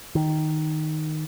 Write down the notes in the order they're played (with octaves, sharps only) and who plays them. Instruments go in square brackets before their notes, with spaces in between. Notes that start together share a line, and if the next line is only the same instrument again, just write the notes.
[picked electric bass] D#3